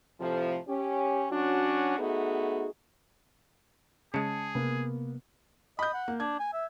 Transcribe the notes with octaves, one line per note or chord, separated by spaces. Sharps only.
F2 A2 C3 F3
C#4 G4
F#3 C#4 D4 F#4
A3 B3 D#4 F#4 G#4
C#3 G#3 G#4 A5 C#7
C3 A#3 B3
D#5 B5 G6
F#5
A#3
D4 G#6
G#5
E5